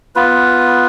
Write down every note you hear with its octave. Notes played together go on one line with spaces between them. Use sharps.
B3 F4 B4